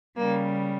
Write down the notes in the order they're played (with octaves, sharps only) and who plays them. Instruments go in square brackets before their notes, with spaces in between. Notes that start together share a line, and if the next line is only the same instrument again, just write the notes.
[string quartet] C#3 G3 A#3